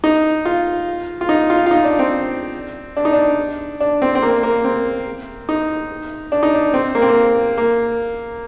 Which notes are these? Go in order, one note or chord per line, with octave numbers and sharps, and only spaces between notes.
D#4
F4
F4
D#4
F4
F4
D#4
D4
C4
D4
D#4
D4
D4
C4
C4
A#3
A#3
C4
D#4
D4
D#4
D4
C4
A#3
C4
A#3
A#3